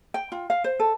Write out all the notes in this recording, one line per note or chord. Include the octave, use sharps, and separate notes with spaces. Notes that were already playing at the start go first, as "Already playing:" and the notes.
G5
F4
F5
C5
A4